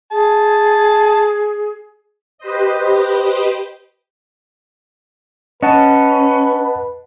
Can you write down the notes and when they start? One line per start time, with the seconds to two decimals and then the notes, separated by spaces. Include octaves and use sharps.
0.12 G#4 A5
2.38 G4 B4 C5 D#5
5.63 C#4 B4 D#5 F#5 A5